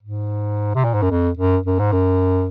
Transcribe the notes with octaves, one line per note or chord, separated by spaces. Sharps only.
G#2
C3
A#2
G#2
F#2
F2
F#2
F#2
G#2
F#2